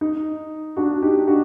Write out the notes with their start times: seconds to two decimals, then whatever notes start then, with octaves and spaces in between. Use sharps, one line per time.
0.01 D#4
0.76 D4 F#4
1.02 D#4 G4
1.28 D4 F#4